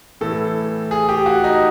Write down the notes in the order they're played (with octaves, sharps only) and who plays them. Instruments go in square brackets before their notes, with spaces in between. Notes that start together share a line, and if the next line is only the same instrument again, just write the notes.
[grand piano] A2 E3 A4
G#4
G4
F#4
D#4